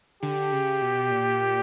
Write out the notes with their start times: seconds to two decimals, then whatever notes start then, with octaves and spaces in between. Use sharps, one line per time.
0.23 D3 G4
0.52 C#3
0.82 B2
1.11 A#2